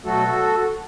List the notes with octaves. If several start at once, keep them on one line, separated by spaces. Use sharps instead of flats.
B2 F#3 A3 F#4 A4